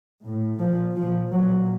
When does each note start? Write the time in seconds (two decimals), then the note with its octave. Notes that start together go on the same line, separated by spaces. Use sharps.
0.23 A2
0.59 A#2 F3
0.95 A#2 F3
1.32 A#2 F#3